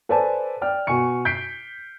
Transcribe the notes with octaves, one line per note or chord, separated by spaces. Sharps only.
A4 B4 C5 D5 G#5 A5
D5 G5 F6
B2 F#4 G#5 C#6 C#7
G6 B6 C7 D7